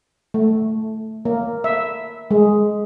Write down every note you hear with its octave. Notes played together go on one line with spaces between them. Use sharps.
A3
A#3
E5
G#3